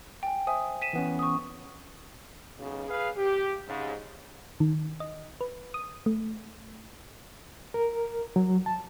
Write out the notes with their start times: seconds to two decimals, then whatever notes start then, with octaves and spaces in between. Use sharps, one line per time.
0.23 G5 G#5
0.47 C5 E5 G#5 D#6
0.82 B6 D#7 E7
0.93 E3 B3 C#4
1.19 C#6 D#6
2.58 B1 C#3
2.88 G#4 B4 F5
3.17 G4
3.68 G#2 C#3
4.60 D#3
5.00 D#5
5.41 B4
5.74 D#6
6.06 A3
7.74 A#4
8.36 F#3
8.66 A5